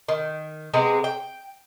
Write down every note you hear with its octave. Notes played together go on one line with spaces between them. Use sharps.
D#3
C3 G#3 B3 G#4
G5